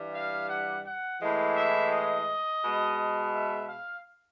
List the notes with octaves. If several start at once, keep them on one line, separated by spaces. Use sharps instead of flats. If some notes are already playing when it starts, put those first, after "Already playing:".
Already playing: G2 E3 G3
F5
F#5
F#5
A2 E3 G#3
E5
D#5
B2 G#3
E5
F5